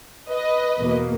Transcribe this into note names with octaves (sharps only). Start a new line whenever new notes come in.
B4 D#5
E2 B2 A#3